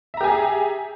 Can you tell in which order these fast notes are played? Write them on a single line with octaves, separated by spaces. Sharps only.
E5 A#5 G4 G#5 G#4